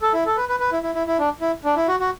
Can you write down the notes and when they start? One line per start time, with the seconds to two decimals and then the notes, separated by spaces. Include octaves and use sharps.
0.02 A4
0.13 E4
0.26 A4
0.37 B4
0.49 B4
0.60 B4
0.72 E4
0.83 E4
0.95 E4
1.07 E4
1.19 D4
1.41 E4
1.64 D4
1.76 E4
1.88 F#4
2.00 F#4